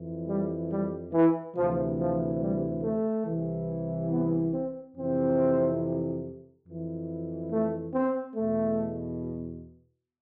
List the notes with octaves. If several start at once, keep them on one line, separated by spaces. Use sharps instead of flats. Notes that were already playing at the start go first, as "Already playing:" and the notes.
Already playing: F2 E3
G3
G3
E3
D2 C3 E3 F3
F3
G3
A3
C2 C3 E3
B3
C4
F2 C3 E3 C4
F2 E3
A3
C4
E2 B2 A3